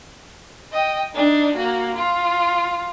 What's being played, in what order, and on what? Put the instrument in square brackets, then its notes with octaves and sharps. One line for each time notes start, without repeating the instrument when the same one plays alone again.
[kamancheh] D#5 G5
D4 D#4
A#3 F#4
F4